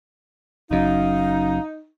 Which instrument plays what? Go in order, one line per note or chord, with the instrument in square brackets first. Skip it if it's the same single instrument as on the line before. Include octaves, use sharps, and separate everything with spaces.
[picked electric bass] F#1 F#2 [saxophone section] D#4 [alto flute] F5